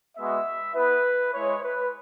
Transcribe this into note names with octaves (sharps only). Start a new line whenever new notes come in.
G#3 B3 F#4 E5
B3 E4 B4
G#3 E4 C#5
B4